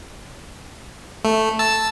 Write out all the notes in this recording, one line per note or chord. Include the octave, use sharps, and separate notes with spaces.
A3
A5 E6